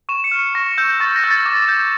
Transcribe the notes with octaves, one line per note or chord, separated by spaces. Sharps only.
C#6 E7
C#7
F6
C#7
C#6 A#6
E6 G6
C#6 A6
A#6
E6 G6
A6
D6
G6